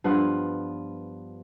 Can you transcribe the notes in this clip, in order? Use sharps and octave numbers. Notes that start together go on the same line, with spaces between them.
G2 F3 B3 F4